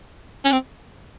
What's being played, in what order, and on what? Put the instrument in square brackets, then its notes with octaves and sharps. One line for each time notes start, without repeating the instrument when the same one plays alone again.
[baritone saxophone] C#4
C4